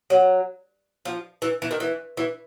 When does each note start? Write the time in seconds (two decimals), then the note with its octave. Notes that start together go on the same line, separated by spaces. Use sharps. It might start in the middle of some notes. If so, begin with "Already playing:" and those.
0.10 F#3
1.05 F3
1.42 E3
1.62 E3
1.71 D#3
1.80 E3
2.17 E3